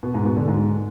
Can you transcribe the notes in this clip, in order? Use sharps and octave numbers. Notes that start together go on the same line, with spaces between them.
B2
G#2
B2
D3
G#2